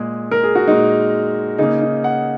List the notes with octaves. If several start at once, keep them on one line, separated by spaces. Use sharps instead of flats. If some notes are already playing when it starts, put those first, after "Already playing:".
Already playing: A#2 G#3 G#4
A#4
G#4
F#4
A#2 G#3 D#4
C#3 A#3 D#4
D#4
F#5